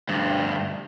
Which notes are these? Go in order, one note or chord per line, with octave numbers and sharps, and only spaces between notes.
D2 G2